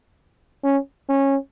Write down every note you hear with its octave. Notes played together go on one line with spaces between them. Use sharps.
C#4
C#4